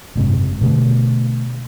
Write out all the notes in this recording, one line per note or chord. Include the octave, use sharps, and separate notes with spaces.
F#1 G#2 C3
B2 D3 A3